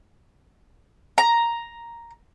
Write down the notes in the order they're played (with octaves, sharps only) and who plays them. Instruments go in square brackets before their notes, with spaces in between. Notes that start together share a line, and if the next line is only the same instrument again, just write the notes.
[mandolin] A#5